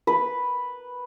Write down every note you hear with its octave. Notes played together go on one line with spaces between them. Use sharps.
B4